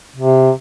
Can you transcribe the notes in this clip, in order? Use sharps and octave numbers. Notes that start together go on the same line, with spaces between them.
C3